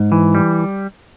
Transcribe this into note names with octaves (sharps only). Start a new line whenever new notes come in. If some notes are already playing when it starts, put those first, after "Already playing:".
Already playing: G#2
E3
G3